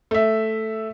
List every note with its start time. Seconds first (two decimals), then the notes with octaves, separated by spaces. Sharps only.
0.11 A3 E5